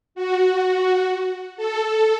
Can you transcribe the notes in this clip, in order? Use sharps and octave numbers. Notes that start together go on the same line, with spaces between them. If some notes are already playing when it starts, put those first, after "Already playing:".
F#4
A4